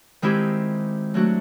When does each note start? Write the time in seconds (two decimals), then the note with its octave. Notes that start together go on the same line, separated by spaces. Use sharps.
0.22 D#3 G#3 C4 E4 G4
1.14 F#3 A3 D4 F#4